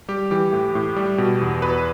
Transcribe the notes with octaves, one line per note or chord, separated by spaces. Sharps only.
G3 G4
E3 G4
A2
A2
G3
B2
E2
E2 B4